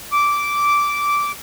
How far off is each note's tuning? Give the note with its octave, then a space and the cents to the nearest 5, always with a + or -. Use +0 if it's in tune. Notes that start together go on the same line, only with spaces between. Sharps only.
D6 -10